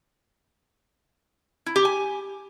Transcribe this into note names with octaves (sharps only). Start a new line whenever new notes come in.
E4
G4
G#5